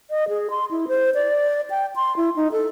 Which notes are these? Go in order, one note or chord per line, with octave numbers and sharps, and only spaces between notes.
D#5
G#4
C6
E4
C5
D5
G5
C6
E4
D#4
A4